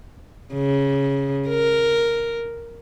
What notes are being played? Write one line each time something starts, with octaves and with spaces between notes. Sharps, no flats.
C#3
A#4